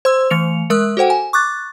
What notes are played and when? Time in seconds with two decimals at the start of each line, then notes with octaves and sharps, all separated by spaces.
0.05 C5 C6 E6
0.30 E3 A3 C#7 F7
0.70 G#3 A#4 D#6 E6 F#6
0.97 F#4 A4 C5 F#5 G5
1.10 G#5
1.33 C#6 D6 F#6 A6